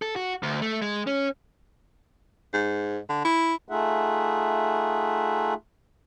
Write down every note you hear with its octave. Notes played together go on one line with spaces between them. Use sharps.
A4
F#4
D2
A3
G#3
C#4
G#2
D3
E4
A3 D#4 F4 G#4 E5 F#5